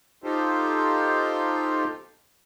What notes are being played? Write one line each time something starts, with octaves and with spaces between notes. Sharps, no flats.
D#4 F4 G4 A4 C5